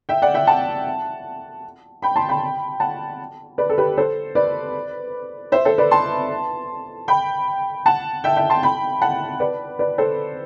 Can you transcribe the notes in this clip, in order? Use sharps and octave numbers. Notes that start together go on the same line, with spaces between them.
E5 G5
D5 F#5
E5 G5
F#5 A5
G5 B5
A5 C6
G5 B5
F#5 A5
B4 D5
A4
G4 B4
A4 C5
B4 D5
C5 E5
A4 C5
B4 D5
A5 C6
G5 B5
F#5 A5
E5 G5
E5 G5
A5 C6
G5 B5
F#5 A5
B4 D5
B4 D5
A4 C5